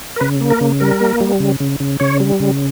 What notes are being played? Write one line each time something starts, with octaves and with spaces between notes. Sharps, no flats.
A#4
C#3 B4
A#3
A#4
C#3
G3 A#4
A#3
G3
C#3
C#3
C#3
C#3 C#5
G3
C#3